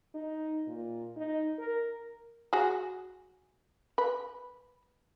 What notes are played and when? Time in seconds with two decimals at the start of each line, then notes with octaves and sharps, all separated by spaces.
0.15 D#4
0.67 A#2
1.17 D#4
1.59 A#4
2.53 F#4 G#4
3.98 B4